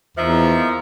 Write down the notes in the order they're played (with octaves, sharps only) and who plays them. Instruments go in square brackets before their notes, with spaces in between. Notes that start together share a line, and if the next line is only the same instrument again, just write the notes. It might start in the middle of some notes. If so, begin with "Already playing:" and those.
[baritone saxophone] E2 [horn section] D#3 F3 [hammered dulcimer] A#3 D#4 [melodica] E5